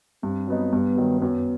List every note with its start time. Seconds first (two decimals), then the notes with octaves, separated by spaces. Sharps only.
0.23 G2 C4
0.47 F#3 B3 D#4
0.73 G2 B3
0.97 D#3 F#3
1.22 F#2 B3